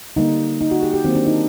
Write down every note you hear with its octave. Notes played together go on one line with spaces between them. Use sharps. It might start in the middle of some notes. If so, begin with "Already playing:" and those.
D3 G3 A#3 D#4
D#4
F#4
G4
G4
D#3 F#3 A#3 C4
D4
D#4